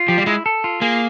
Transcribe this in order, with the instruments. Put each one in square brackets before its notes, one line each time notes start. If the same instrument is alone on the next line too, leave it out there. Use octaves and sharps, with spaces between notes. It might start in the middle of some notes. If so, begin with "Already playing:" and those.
Already playing: [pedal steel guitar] F4
[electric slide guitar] F3 [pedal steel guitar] G4
[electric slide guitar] G3
[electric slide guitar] G#3 [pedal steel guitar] E4
[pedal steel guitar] A4
F4
[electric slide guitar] A#3 [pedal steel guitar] G#4